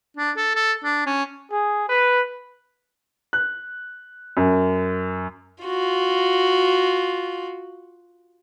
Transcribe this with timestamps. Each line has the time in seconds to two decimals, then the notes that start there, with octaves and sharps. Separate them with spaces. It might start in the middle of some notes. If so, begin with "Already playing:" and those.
0.17 D4
0.37 A4
0.55 A4
0.84 D4
1.06 C#4
1.51 G#4
1.89 B4
3.33 F#6
4.37 F#2
5.64 F4 F#4